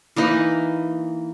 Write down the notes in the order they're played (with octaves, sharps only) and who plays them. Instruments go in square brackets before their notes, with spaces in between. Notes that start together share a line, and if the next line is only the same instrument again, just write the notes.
[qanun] E3 A#3 D#4 B4